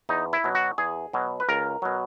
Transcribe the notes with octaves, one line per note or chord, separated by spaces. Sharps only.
E2 D#4
E4
B2 F#3
F#4
E2 G#4
B2 F#3
B4
C#2 A#4
B2 F#3